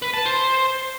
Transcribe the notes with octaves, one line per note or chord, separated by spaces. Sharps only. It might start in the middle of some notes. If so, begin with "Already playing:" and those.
B4
A5
C5